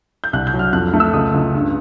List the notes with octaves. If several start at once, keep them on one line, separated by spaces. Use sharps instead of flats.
G6
C2 F#6
G6
F#3
F6
F2 F#6
F6
A3
E6
C#2 D#6
C#2
G2